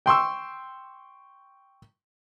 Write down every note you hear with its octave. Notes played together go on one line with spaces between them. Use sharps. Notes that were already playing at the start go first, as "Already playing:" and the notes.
G5 C6 C#6 E6